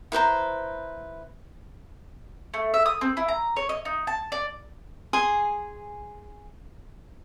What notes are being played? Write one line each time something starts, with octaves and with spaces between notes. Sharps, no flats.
E4 B4 C5 A#5
A3
E5
D#6
C4
E4
A#5
C#5
D#5
D#4
A5
D5
G#4 G#5 C6 D#6